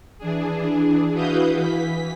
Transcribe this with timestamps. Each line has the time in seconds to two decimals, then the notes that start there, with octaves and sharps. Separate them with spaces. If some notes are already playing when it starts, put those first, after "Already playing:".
0.18 E3 D4 G#4
1.11 E4 F#4 B4 F5 D#6 G6
1.55 E3 B6